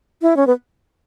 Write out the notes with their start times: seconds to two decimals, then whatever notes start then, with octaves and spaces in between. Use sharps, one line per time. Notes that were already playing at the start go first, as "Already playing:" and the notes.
0.22 E4
0.37 C#4
0.47 B3